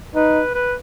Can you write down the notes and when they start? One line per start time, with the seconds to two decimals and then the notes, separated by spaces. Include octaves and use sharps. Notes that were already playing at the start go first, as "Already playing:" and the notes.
0.14 D#4 B4
0.54 B4